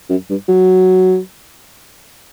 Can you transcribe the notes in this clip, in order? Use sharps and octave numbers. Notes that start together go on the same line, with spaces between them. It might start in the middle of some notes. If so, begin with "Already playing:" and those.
F#2
G2
F#3